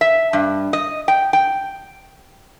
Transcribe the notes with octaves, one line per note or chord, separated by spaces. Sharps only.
E5
G2
D#5
G5
G5